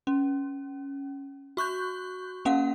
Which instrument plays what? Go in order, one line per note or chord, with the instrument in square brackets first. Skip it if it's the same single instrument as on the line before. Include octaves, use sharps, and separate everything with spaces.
[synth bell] C#4
F#4 C#6 F#6 G6
A#3 C#4 F5 F#5